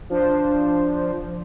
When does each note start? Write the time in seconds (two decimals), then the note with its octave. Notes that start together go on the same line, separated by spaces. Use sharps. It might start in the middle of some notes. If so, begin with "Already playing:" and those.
0.10 F3 D4 C5